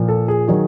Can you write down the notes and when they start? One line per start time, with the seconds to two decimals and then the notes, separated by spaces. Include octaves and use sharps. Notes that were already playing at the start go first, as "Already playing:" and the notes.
Already playing: A#2 F3
0.08 A4
0.28 G#4
0.47 D#3 F#3 G#4